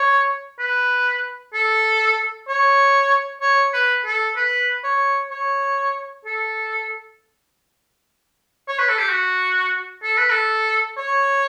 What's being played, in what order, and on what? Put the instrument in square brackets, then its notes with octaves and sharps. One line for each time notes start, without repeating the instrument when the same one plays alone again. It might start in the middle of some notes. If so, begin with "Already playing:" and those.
Already playing: [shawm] C#5
B4
A4
C#5
C#5
B4
A4
B4
C#5
C#5
A4
C#5
B4
A4
G4
F#4
A4
B4
A4
C#5